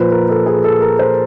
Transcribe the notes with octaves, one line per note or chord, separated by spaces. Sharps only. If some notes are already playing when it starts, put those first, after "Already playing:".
Already playing: A#2 F3 B4 C5
A#4
A4
G#4
A4
A#4
C5